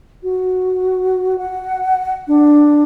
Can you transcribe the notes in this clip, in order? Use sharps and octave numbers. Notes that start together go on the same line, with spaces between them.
F#4
F#5
D4